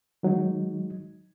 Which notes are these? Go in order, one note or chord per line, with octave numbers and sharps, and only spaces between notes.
D#3 F#3 G#3 D#4